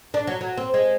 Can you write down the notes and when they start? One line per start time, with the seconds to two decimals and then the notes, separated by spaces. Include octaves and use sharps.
0.14 D4
0.27 F#3
0.41 F#3
0.57 C4
0.74 G#3